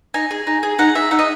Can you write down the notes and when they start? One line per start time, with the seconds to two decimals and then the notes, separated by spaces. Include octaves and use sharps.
0.14 D#4 G#5
0.31 G#4
0.47 D#4
0.63 G#4
0.79 D#4 F#5
0.95 G#4 E5
1.11 D#4 F#5
1.19 D#5